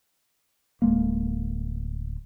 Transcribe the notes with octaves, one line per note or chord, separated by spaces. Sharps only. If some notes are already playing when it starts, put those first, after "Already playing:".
D1 G#3 A#3